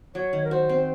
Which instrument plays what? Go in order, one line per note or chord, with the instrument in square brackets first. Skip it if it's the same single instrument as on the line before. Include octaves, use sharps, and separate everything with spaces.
[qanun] F#3 [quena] C#5
[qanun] D#3
[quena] A#4
[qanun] F#4 [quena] C5
[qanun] C4